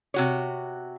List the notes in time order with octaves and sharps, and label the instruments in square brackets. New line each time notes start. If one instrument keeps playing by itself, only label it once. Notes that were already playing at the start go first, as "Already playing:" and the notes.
[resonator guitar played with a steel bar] C3 F#4 C#5